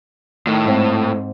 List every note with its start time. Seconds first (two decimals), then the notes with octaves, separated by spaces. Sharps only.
0.47 A2 D#3
0.65 G#2 C4